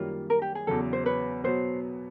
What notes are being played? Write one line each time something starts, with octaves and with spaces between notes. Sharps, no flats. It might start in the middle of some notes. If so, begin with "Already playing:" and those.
Already playing: F#2 D#3 G3 A#3 F4
A#4
G4
G#4
E2 C#3 F#3 A4
C5
B4 C#5
B2 F#3 B3 C5